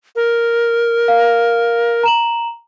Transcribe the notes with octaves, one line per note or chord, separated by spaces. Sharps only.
A#4
F5
A#5 E7 F#7